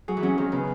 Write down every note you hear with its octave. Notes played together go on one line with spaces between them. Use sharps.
F#3 G#4
E3
F#3 C#4
D#3 G#3
C#3 B3